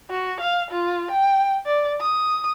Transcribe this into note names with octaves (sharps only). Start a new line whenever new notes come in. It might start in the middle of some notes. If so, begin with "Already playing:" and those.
F#4
F5
F4
G5
D5
D#6